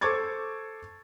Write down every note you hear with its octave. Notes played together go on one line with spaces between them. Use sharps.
A4 C5 C#6 D6 G#6 A6